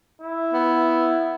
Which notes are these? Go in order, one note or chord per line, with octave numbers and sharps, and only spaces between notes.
E4
B3